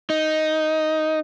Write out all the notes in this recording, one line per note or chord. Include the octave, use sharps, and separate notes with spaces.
D#4